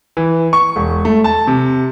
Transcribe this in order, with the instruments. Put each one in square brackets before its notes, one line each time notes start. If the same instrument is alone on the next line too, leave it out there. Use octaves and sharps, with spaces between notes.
[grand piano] E3
C#6
E1
A3
A5
C3